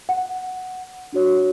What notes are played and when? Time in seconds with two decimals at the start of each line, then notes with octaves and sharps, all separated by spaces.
0.09 F#5
1.13 D4 F#4 C#5